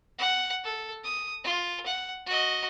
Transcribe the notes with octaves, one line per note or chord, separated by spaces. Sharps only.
F#5
A4
D#6
F4
F#5
F#4 D#5